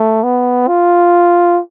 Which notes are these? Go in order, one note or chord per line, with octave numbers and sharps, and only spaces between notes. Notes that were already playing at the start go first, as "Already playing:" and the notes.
Already playing: A3
B3
F4